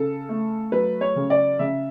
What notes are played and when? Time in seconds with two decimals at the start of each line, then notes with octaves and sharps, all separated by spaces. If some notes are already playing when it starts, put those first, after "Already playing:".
Already playing: C#3 A4
0.29 A3
0.72 F#3 B4
1.01 C#5
1.16 C#3
1.30 D5
1.59 C#3 E5